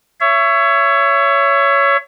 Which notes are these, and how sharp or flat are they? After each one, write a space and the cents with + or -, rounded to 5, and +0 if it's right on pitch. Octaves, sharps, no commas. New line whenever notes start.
C#5 +10 E5 +30